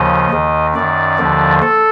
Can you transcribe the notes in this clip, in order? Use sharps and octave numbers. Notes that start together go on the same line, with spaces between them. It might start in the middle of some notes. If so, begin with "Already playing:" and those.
Already playing: D#2 C#3 F3 D#5
D#2 D#3
F#2 D#3 D5
D#2 D3 F3
A4